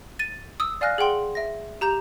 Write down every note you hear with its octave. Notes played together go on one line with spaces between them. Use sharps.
A6 D#7
D#6 E6
D5 F5 G#5 F6 F#6 A#6
G#4 F#5 G5 C6
E5 A#6
G4 A#5 G6 F7